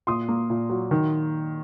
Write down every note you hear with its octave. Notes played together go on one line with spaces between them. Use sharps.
A#2 C6 D#6
A#3
A#2
F#3
D#3